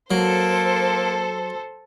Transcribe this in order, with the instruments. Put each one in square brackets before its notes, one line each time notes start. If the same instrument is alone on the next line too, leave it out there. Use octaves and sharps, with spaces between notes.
[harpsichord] F#3 [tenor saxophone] A#3 [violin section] A4 C5